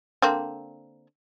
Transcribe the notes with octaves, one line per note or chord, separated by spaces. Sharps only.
D3 A#3 C4